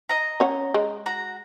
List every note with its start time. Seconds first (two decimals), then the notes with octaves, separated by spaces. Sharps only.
0.09 D#5 A#5
0.40 C#4 C#5 F#5
0.74 G#3
1.06 F#4 A#5